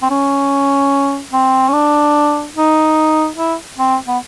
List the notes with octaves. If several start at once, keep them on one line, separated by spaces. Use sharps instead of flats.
C4
C#4
C4
C#4
D4
D#4
E4
C4
B3